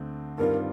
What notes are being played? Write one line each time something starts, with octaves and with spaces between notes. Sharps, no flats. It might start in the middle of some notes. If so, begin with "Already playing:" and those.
Already playing: D2 D3 A3 C4
G2 D#3 G3 C4 F4 A#4